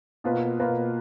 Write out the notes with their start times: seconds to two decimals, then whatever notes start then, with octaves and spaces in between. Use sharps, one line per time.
0.24 B2 A#3 F4 B4
0.59 B2 A#3 F4 B4